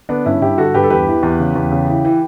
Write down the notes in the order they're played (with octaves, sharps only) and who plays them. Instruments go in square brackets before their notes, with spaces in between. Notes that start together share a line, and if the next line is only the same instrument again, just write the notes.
[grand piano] D3 B3 D4
G2 C#4 E4
G2 E4 G4
D3 F#4 A4
G2 G4 B4
A4
E2 G4 B4
E3
E2
C#3
E2
C#3
E3
E3